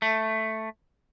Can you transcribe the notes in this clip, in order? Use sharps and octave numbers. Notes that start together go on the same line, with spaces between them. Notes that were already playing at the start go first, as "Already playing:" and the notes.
A3